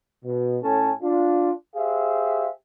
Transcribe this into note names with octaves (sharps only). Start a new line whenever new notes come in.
B2
A2 C#4 A4 G#5 A5
D4 F4
G4 G#4 C5 E5 F5